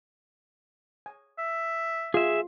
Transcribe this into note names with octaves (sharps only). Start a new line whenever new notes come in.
G#5
E5
F4 G#4 E5